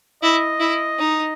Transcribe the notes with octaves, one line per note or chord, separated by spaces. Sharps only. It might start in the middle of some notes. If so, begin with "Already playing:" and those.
E4 D#5
E4
D#4